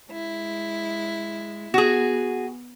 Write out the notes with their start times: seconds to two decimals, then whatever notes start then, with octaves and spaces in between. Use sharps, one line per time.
0.10 G#3 E4
1.74 B3 F#4 G#4